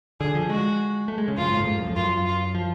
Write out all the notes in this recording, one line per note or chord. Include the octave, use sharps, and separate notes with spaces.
D3 G#4
F3
G#3 F#4
A3
G#3
C#3
F#2 F4
G#2
A2
G#2
F#2
F2
F#2 F4
F4
F3